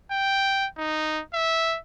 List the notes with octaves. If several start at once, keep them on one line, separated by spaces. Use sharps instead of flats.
G5
D#4
E5